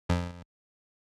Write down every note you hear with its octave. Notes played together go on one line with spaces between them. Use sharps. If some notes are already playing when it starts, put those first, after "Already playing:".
F2